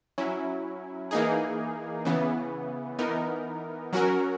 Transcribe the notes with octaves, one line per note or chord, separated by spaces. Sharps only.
F#3 C#4 E4
E3 A#3 D#4 G#4
C#3 E3 B3
E3 B3 D#4 A#4
F#3 C#4 F#4 A#4